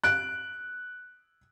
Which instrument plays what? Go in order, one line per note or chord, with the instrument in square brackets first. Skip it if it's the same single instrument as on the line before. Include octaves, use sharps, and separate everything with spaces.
[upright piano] F#6 D7